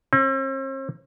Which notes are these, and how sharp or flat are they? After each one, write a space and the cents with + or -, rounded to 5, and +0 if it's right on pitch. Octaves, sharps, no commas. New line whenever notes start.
C4 +45